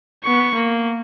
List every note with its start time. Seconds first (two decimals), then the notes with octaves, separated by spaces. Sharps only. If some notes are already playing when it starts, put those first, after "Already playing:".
0.24 B3 C#6
0.55 A#3